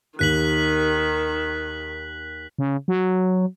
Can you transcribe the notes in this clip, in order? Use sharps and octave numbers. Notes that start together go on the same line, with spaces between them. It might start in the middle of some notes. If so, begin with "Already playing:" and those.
D#2 D#3 G4 F#6 B6 F#7
C#3
F#3